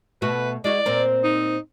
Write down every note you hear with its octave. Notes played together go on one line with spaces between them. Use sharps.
B2 A3 F#4 B4
G#3 E4 F#4 D5
A#2 C4 A#4
D#4